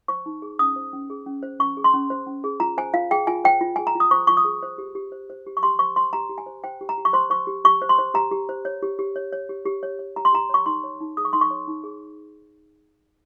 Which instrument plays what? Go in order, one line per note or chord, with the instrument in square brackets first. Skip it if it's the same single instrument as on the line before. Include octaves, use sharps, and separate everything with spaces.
[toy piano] C5 C#6
D#4
G#4
C#4 D#6
C5
C#4
G#4
C#4
C5
C#4 C#6
G#4
C6
C#4
C5
C#4
G#4
F4 A#5
C5 G#5
F4 F5
G#4 G5
F4 G#5
C5 G5
F4
G#4 G#5
A#5
F4 D#6
C5 C#6
F4 C#6
D#6
G#4
C5
G4
G4
C5
C5
G4
C#6
G4 C6
C5 C#6
C5 C6
G4 A#5
G4
G#5
C5
C5 G5
G4
A#5
G4
C#6
C5 C6
C5 C#6
G4
G4 C#6
C5
C6
C5
G4 A#5
G4
C5
C#5
G4
G4
C#5
C#5
G4
G4
C#5
C#5
G4 A#5
C6
G4 A#5
C#5 C#6
D#4 C6
C#5
D#4
G#4 D#6
C#6
D#4 C6
C#6
C#5
D#4
G#4